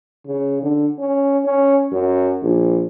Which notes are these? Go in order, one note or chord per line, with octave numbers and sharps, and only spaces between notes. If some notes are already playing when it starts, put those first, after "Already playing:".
C#3
D3
C#4
C#4
F#2
A#1